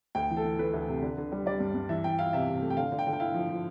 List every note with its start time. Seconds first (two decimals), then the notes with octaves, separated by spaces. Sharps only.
0.15 D2 G5
0.30 E3
0.37 A4
0.44 E3
0.58 A3 B4
0.74 D2
0.88 C3
1.02 D3
1.18 D3
1.32 G3
1.46 G3 D5
1.60 G2
1.75 G2
1.89 E3 E5
2.04 E3 G5
2.18 E4 F5
2.33 C3 E5
2.48 C3
2.62 A3
2.70 G5
2.77 D3 F5
2.92 D3
2.99 G5
3.06 D3
3.13 G5
3.20 E4 F5
3.34 F3
3.49 F3